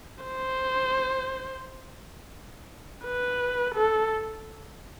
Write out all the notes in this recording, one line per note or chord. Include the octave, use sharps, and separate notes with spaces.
C5
B4
A4